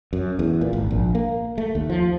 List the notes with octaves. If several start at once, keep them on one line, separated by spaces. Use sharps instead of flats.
F#2
E2
A#2
G#1
A#1
A#3
A3
D#2
F3